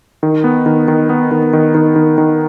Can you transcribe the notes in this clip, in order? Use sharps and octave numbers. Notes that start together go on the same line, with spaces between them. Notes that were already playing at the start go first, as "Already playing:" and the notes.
D#3
B3
D#3
D#3
B3
D#3
D#3
D#3
D#3
D#3